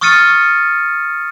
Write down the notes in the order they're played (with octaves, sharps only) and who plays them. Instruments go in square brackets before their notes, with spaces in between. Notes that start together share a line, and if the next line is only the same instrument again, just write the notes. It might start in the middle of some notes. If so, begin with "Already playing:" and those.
[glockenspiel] C#6 D#6 F6 A6 C#7 D#7